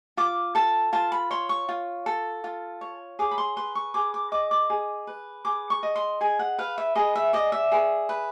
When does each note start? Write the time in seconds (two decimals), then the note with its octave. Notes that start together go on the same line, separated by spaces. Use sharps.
0.17 F4 D6
0.55 A4 A5
0.93 F4 A5
1.12 B5
1.31 C#5 C6
1.49 C#6
1.69 F4
2.06 A4
2.44 F4
2.81 C#5
3.19 G#4 D6
3.31 B5
3.38 C6
3.56 B4 C6
3.75 C#6
3.94 G#4 D6
4.14 D6
4.32 D#5 D6
4.51 D6
4.70 G#4
5.07 B4
5.45 G#4 D6
5.70 C#6
5.83 D#5
5.96 C6
6.21 G#4 G#5
6.39 F#5
6.59 B4 F5
6.78 E5
6.95 G#4 D#5
7.16 E5
7.33 D5 D#5
7.52 E5
7.72 G#4
8.09 B4